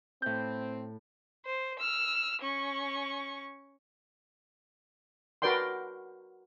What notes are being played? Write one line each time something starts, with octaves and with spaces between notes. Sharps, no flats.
A2 C4 G6
C5
E6 F6
C#4 C#6
F#4 A#4 B4 D5 G5 C6